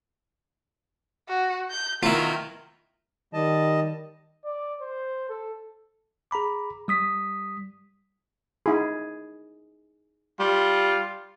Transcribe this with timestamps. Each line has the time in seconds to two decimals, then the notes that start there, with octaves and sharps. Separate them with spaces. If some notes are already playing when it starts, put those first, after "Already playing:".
1.28 F#4
1.71 G6
2.03 B2 D#3 F#3 E4 F4 A#4
3.34 D#3 G3 D#5 A5
4.44 D5
4.81 C5
5.29 A4
6.31 G#4 A#5 B5 D6
6.88 G3 D#6 B6
8.66 D#4 E4 G#4
10.40 G3 F4